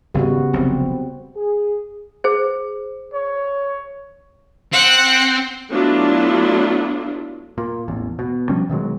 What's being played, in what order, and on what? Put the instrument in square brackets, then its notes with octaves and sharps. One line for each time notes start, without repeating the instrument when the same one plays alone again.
[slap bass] G#1 [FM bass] C#3 [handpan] G3 B3 F#4
[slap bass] F1 B1 [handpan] C4
[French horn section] G#4
[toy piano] G#4 C5
[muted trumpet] C#5
[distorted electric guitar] C4 [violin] F#5
[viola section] F#3 A3 B3 D4 E4 F4
[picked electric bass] A#2
A1 E2
B2
B2 F3 G3 C#4
B2 D#3 F#3 G#3